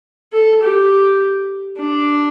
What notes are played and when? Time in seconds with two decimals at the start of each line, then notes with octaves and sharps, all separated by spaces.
0.33 A4
0.62 G4
1.78 D4